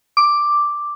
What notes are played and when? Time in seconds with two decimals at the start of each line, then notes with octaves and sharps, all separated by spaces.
0.17 D6